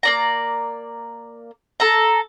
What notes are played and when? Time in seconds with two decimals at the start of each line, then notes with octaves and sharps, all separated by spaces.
0.03 A#3 D5 A#5
1.80 A4 A#5